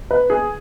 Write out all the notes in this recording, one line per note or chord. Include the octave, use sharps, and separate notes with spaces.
B4
G#4